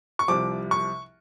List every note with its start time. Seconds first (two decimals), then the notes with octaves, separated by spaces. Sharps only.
0.19 C#6
0.28 C2 C3 F3 D6
0.71 C#6